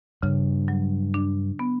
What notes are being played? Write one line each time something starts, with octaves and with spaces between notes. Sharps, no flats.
G2 C#3
F#3
D4
B3